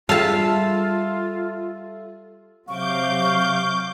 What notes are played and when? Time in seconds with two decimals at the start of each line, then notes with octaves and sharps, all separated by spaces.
0.09 G3 F4 G#4 A4 E5 F5 A5 E6
2.68 C3 F#3 F5 C#6 D6 G6